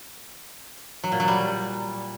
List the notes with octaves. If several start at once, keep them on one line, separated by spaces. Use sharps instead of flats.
F#3
A#2
F#3
G3